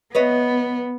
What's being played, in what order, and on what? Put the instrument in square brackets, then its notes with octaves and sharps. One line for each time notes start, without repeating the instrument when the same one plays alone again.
[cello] B3 [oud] B4 C#5 D#5